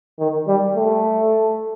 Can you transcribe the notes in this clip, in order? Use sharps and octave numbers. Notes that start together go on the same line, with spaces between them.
D#3
G3
A3